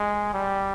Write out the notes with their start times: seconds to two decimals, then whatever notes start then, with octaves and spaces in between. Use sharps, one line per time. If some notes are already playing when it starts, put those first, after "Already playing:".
Already playing: G#3
0.33 G3